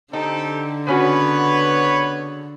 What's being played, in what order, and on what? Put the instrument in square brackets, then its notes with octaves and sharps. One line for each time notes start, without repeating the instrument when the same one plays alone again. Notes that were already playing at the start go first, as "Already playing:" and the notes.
[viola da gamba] D3 [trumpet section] C4 G4 A4 [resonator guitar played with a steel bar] D#4
[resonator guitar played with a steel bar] C#3 C#4 F#4 [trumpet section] B3 B4 B5 [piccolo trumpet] C#5